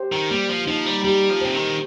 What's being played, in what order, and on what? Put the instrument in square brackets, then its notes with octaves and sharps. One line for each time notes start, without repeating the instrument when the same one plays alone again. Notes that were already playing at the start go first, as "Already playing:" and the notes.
Already playing: [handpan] G4 C5
[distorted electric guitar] D#3
[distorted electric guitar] G3 [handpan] A#3
[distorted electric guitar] F3
[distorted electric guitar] F3 [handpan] D#4
[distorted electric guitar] G3
[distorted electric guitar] G3 [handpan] G4
[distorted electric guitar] F3
[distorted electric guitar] C3 [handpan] C5
[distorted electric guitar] D#3